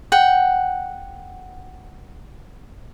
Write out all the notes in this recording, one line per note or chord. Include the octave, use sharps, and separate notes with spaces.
F#5 G5